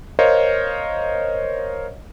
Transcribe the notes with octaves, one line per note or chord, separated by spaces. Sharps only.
A#4 C5 C#5 D#5 F5